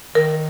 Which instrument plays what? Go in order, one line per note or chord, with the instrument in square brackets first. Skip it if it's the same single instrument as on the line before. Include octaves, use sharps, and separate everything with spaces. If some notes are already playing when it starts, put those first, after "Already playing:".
[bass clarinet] D#3 [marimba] A#4